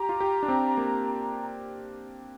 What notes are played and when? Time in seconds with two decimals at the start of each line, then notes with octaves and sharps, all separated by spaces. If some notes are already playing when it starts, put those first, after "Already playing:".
Already playing: G4 A#5
0.09 F4
0.20 G4
0.43 D4
0.48 C4
0.77 A#3